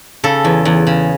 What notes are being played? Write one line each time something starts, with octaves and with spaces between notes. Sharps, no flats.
C#3 A4
E2
E2
C#3